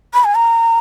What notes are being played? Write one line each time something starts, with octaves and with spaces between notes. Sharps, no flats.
B5
G#5
A#5